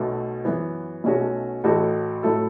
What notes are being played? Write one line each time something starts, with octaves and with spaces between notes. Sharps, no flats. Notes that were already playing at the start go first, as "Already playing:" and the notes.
Already playing: B1 B2 A3
F#2 E3 B3
B1 B2 A3 C#4 F#4
A1 A2 A3 F#4 A4
A2 F#3 A3 E4 A4